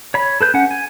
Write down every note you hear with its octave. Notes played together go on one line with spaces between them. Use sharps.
C#5 B5
A4 B4 G6
C#4 F#5
G#5